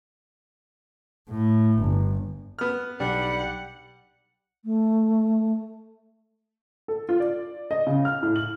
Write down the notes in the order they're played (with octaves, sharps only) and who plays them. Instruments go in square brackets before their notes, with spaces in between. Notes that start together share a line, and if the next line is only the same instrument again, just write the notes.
[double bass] A2
G1
[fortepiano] B3 F6
[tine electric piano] B1 [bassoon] G3 [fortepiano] D4 [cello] F#5
[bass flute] A3
[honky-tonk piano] A4
F4
D5
D#5
C#3
F6
A2
F#7